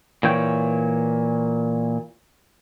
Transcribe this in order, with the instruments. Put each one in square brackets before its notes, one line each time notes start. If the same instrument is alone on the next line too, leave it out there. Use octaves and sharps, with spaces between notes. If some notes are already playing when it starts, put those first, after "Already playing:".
[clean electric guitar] A#2 E3 C#5 G5